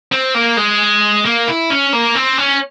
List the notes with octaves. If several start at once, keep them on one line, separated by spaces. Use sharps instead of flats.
C4
A#3
G#3
A#3
E4
C#4
A#3
C4
C#4